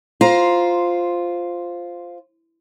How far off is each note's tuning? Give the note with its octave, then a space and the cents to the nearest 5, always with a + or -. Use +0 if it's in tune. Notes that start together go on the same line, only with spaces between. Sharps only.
F4 +0 C5 +0 A#5 +10